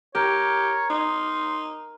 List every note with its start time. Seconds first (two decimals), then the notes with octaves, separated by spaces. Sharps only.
0.15 G4 A#4 C#5
0.90 D#4 C6